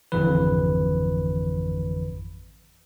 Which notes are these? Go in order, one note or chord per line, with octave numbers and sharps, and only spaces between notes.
G#1 F2 D3 E3 B4